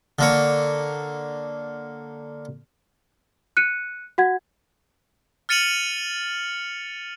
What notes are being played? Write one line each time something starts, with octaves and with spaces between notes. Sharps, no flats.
D3 A#3 C#5
F#6 C#7 D#7
F#4 F#5 G#6
F6 A6 C#7 D#7 F7 F#7